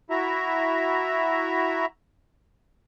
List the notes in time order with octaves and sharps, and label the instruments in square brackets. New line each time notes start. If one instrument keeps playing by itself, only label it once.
[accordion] E4 F#4 E5 A#5